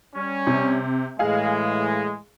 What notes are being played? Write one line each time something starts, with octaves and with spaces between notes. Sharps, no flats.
G3 C#4
C3
A2 E3 G#3 G#4 F5